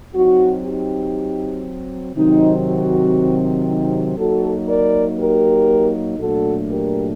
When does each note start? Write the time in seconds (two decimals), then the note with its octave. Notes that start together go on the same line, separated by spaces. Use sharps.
0.15 F#3 C4 D#4 F#4
0.64 D#4 G4
2.16 C3 D#3 F#3 C4 D#4
2.67 F#4
3.67 D#4 G4
4.17 F#3 A#3 D#4 F#4 A4
4.68 A#4 D5
5.19 G4 A#4
6.19 A#2 F#3 A3 D4 F#4 A4
6.69 G4 A#4